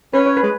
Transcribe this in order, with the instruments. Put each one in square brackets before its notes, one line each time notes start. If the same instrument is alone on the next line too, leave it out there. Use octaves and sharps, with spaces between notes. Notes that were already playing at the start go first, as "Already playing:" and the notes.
[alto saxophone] C#4 [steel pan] B4
[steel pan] C#5
B4
[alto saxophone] G#3